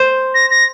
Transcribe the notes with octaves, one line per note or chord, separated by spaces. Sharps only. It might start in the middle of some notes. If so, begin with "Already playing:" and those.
Already playing: C5
A#6
A#6